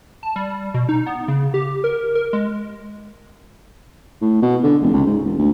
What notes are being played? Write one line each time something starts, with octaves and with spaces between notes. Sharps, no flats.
A5
G3
B2
D#4
B3
C#3
G4
A#4
A#4
G#3
A2
B2
D3
F1
C#2
G#2
E1
D2